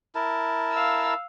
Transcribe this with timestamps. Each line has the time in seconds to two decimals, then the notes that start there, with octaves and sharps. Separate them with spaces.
0.15 E4 A#4 A5
0.72 F5 E6